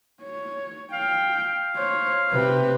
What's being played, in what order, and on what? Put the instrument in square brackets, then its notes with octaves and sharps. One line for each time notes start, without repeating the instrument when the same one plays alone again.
[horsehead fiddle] C#5
[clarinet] F5 [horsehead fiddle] G5
[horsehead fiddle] C5 C#5
[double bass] C3 [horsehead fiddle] G4 B4